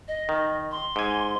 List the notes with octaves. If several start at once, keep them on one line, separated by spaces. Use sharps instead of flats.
D#5
D#3
C6
G#2 G#5